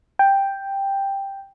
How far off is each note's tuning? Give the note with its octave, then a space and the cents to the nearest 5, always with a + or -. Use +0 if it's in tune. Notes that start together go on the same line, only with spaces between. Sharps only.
G5 +5